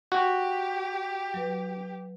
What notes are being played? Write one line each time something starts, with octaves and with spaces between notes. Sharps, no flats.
F#4 G4
F#3 B4